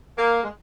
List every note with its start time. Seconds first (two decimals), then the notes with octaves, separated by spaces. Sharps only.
0.18 A#3
0.43 G#3